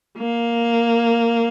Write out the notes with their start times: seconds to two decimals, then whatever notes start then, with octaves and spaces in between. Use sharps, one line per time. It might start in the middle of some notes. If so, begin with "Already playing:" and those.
0.18 A#3